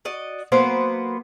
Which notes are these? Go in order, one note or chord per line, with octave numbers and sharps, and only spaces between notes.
F#4 D5 D#5
F#3 A#3 B3 C5